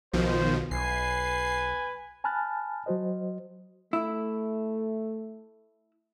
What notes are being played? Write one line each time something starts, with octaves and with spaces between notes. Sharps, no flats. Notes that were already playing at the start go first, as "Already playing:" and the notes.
B1 B2 D#3 F3 C5
B1 B4 G#5 C7
G#5 A5 B5 F6 F#6 A6
F#3 F#4 C5 D#5
A3 E4